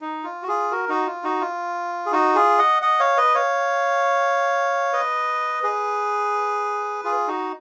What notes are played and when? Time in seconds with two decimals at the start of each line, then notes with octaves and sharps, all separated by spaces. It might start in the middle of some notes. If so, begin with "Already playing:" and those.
0.01 D#4
0.24 F4
0.43 F#4
0.48 F4 G#4
0.71 F#4 A#4
0.89 D#4 F#4
1.06 F4
1.24 D#4 F#4
1.41 F4
2.06 G#4
2.12 D#4 F#4
2.35 F4 G#4
2.59 D#5 F#5
2.82 D#5 F#5
3.00 C#5 F5
3.17 B4 D#5
3.35 C#5 F5
4.93 B4 D#5
5.63 G#4 B4
7.04 F4 G#4
7.28 D#4 F#4